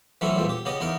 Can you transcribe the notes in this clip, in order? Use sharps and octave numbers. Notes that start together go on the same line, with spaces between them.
E3 F#3 A3 C4 C#4 E4
E2 G2 A#2 A3 C4
G4
C#3 B3 G4 D#5
E2 B3 D#4 A#4